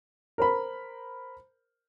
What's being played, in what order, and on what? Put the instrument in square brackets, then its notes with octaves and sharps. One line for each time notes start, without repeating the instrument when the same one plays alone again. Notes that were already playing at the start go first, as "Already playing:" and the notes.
[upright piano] A#4 C5 B5